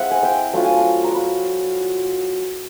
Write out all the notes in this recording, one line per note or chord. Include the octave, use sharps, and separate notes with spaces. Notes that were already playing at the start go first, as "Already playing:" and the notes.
Already playing: G#3 C4 E4 E5 F#5
G#5
G5
F#3 A3 D4 F4 A5
G#5
A5
A#5
B5